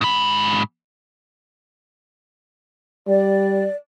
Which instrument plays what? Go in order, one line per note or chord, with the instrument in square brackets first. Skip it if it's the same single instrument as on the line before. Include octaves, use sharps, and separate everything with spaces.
[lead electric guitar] G#2 B5
[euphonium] G3 [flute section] D5